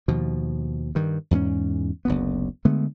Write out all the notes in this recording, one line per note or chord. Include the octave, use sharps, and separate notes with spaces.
D#2 B2 F3
G2 D#3
E2 G#2 G3 C#4
F#1 D2 B3
D3 G#3 A3 B3